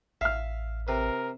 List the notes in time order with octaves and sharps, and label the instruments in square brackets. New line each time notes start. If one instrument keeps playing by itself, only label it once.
[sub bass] A1 [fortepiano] E5 F6 [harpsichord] F5
[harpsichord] C3 B4 [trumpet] A#4